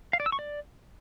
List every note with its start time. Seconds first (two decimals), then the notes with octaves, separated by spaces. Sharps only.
0.13 F5
0.20 D5
0.26 E6
0.32 C#6
0.39 D5